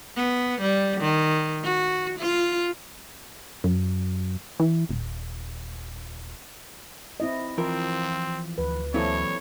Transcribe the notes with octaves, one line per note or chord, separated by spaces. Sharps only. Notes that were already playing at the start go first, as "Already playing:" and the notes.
B3
G3
D#3
F#4
F4
F#2
E3
D#1
C4 E4 D#5
E3 F3 C4 F4 A#4
D2 B4
A#2 E3 F#3 C4 E4 A4 C#5